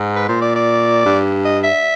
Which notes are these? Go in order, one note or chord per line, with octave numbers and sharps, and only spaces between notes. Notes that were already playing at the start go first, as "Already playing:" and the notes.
Already playing: G#2
B4
A#2 C5
D5
D5
G2
D#5
E5